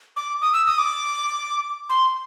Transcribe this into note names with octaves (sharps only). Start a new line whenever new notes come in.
D6
D#6
E6
D#6
D6
C6